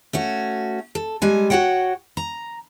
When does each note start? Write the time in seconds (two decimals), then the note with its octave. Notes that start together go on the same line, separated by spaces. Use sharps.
0.13 A3 C#4 F#4
0.95 A4
1.22 G3 G#3 G#5
1.50 F#4 A#4 C#5 F#5 G5
2.17 A#5